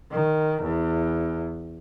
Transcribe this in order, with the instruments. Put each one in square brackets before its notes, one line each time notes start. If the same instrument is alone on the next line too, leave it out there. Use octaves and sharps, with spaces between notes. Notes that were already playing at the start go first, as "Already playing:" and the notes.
[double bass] D#3
E2